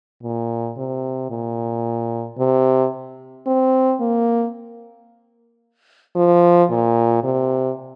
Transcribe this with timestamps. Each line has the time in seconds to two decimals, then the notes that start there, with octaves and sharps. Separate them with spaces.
0.23 A#2
0.77 C3
1.30 A#2
2.39 C3
3.47 C4
4.00 A#3
6.16 F3
6.70 A#2
7.24 C3